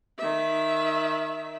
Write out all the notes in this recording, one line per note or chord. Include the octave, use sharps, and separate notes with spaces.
D#3 E5